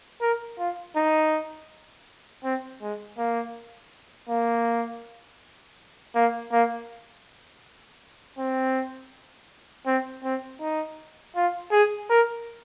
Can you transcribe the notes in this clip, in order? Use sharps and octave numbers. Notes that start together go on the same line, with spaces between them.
A#4
F4
D#4
C4
G#3
A#3
A#3
A#3
A#3
C4
C4
C4
D#4
F4
G#4
A#4